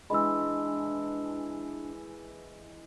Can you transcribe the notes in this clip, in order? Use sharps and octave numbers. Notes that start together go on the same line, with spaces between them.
E3 G#3 D4 B5 E6